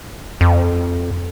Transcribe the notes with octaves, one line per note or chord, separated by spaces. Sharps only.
F2